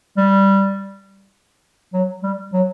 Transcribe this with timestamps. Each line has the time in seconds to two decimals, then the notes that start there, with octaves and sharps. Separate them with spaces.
0.17 G3
1.94 F#3
2.23 G3
2.53 F#3